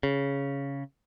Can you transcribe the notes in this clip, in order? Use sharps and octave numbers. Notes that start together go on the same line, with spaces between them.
C#3